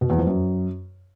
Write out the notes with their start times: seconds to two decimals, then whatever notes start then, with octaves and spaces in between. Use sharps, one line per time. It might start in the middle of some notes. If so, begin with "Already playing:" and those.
0.01 B2
0.10 E2
0.18 F2
0.27 F#2